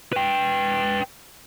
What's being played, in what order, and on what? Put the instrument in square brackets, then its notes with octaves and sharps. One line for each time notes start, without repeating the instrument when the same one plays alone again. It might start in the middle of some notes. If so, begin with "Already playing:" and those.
[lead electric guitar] B4 G5